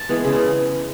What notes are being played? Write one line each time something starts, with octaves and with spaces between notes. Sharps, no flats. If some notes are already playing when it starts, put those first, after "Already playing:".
Already playing: A5
E3 G#3 B3
C#3